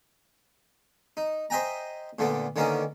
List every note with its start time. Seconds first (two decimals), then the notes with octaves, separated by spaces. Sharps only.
1.17 D#4
1.50 C5 D#5 E5 G5 G#5 A#5
2.19 A#2 D3 A3 B3
2.56 D3 D#3 A#3 B3 C#4 D#4